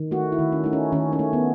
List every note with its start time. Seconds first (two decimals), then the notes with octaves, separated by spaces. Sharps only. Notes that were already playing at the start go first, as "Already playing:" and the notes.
Already playing: D#3
0.11 A3 F#4
0.32 E4
0.39 D#3
0.52 C#4
0.64 A3 D#4
0.73 C#4
0.92 D#3 C#4
1.13 C#4
1.19 A3
1.33 B3